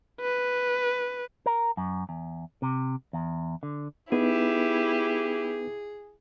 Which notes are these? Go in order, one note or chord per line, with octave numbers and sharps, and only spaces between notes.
B4
A#4
F#2
E2
C3
E2
D3
B3 D#4 E4 G4 G#4 B4